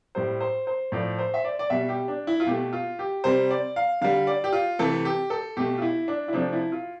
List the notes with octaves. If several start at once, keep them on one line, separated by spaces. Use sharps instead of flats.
A2 G3 C5
C5
C5
A2 F3 A3 D5
C5
E5
D5
D5
B2 G3 E5
G4
D4
E4
F4
B2 A3 G4
F4
G4
C3 G3 C5
D5
F5
D3 G3 F5
D5
G4
F4
C3 E3 A3 A4
G4
A4
B2 A3 G4
F4
E4
D4
E4
C3 F3 A3 D4
E4
F4